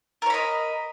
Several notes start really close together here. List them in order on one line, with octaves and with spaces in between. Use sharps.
A#4 C#5 B5 D#5